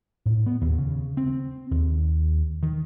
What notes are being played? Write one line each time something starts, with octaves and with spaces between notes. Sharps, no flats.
A2
B3
D#2
C#3
C4
D#2
D#3